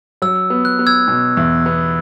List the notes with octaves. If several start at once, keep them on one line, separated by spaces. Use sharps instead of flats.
F#3 E6
B3
F#6
B3
E6 G#6
B2
E2
B3